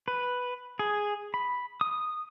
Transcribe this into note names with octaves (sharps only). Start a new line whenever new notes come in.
B4
G#4
B5
D#6